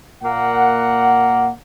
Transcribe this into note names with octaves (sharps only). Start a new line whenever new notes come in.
A#2 A#3 F#5